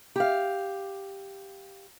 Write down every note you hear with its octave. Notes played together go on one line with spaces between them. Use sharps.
G4 F5